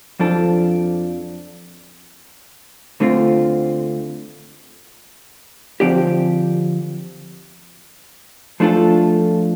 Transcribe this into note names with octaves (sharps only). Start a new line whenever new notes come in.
F2 F3 D4 A4
D2 D3 A3 C4 F4
D3 F3 C4 G4 D5
F3 A3 D4 F4 A4